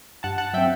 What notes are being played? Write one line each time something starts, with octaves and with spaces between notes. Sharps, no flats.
G2 F#5 A5
F#5 A5
F#3 C4 E5 G5